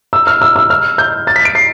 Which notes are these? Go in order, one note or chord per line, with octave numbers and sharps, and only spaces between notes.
E6
F6
E6
E6
F6
G6
A6
B6
D7
C7